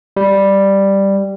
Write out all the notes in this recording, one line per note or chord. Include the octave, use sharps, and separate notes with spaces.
G3